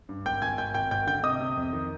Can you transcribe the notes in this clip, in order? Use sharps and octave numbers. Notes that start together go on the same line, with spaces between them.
G2
G#1 G5 G6
G#1 G#5 G#6
G#1 G5 G6
G#1 G5 G6
G#1 G5 G6
D3 G5 G6
C3 D#5 D#6
C3
F2
D#3